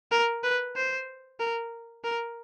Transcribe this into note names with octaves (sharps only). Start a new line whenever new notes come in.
A#4
B4
C5
A#4
A#4